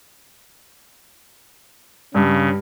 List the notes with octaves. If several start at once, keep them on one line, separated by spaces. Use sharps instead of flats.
G2 C#3